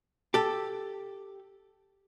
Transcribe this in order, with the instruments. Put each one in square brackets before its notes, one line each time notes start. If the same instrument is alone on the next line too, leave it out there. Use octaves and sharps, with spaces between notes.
[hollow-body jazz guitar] G4 A4